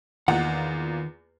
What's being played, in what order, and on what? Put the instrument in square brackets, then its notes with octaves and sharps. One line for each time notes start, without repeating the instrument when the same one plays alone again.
[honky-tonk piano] E2 A#3 F4 [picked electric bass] D#3 [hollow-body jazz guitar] F#5